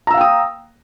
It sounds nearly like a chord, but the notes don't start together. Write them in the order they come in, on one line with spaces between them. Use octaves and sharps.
A#5 E6 F5 G5 D#6